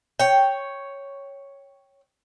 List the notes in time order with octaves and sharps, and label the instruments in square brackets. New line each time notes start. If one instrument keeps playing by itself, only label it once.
[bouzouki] C#5 G5